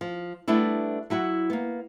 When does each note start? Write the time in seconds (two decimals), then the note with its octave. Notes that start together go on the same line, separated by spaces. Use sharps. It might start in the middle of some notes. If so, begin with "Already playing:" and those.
0.01 F3
0.48 G3 A3 B3 D4 E4
1.10 F#3 E4 F#4 F#5
1.50 A#3 B3